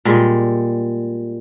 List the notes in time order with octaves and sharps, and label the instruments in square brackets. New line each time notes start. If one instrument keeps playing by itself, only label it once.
[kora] A#2 G3 G#3